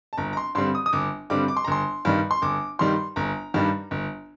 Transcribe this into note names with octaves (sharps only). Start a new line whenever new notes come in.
A5
G1 A#5
A#5
C6
G2 D3 G3 C4 C6
D#6
D#6
G1 D6
G2 D3 G3 C4 D6
D6
C6
A#5
G1 C6
G2 D#3 G3
C6
G1 D6
G2 D#3 G3 C6
G1 A#5
G2 D#3 G3 D4
G1